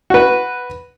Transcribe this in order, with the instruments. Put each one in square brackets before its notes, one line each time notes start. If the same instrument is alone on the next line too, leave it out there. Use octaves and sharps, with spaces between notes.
[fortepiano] F#4 B4